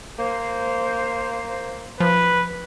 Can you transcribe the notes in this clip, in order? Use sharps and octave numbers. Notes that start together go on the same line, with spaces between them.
A#3 C5
F3 B4